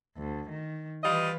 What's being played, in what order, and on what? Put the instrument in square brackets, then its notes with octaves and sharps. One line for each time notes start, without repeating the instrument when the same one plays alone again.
[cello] D2
D#3
[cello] E3 B4 [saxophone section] G3 F4 D#5